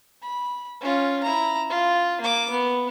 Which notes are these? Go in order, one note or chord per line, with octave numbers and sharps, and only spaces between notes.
B5
C#4 F4
E4 A#5
F4
A#3 D6
B3